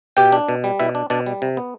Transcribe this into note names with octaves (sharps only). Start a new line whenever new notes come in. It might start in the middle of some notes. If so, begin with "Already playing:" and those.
B2 G4 G5
D4
B2
G3
B2 E4 E5
D4
B2 D4 D5
G3
C3
B3